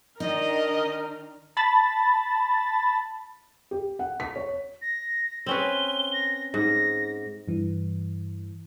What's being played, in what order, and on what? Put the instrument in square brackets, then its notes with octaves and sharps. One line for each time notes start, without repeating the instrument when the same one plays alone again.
[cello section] D#3 D4 [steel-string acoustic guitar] D#4 [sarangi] A#4 [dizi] D#5
[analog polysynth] A5 B5 A6
[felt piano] G4
F#5
B6
C#5
[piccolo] A#6
[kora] C4 C#4 B4 [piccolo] G7
[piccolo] A#6
[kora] G#2 [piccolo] A#6
[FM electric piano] G2 E3